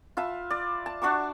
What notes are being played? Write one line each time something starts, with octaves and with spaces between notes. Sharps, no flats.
F4 B4 E5 A5
D5
A5
D4 F#4 C#6 D6